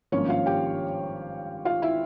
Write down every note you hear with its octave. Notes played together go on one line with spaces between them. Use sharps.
G#1 G2 F3 A#3 C#4 C#5
F4 F5
G4 G5
F4 F5
E4 E5